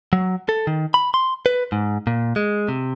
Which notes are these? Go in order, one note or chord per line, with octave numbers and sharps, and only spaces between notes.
F#3
A4
D#3
B5
C6
B4
G#2
A#2
G#3
C3